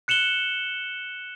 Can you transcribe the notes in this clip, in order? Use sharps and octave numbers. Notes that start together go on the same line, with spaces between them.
F#6 C#7 E7 F#7 G7